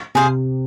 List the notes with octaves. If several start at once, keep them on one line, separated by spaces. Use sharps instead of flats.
C3 G#4 C5 F5